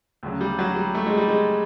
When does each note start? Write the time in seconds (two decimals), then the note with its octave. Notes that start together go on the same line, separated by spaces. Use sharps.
0.23 D2 C#3 F#3
0.41 G3
0.59 F#3
0.76 G3
0.95 A3
1.06 G#3
1.17 G3
1.28 G#3